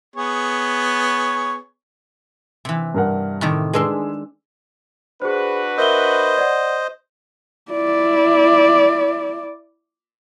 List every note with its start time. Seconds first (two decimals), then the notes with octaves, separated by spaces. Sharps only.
0.16 B3 G#4 C#5
2.65 C3 E3
2.94 G2 A#4 F#5
3.41 A2 C3 D#3
3.73 G#3 D4 G#4 B4 C6 E6
5.22 D4 F#4 G#4 B4 C5
5.78 A#4 C5 D#5 E5 G7
6.38 D5 F#5
7.72 E4 D5